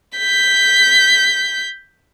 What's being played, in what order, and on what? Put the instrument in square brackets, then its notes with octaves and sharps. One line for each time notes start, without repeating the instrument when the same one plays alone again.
[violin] G6 B6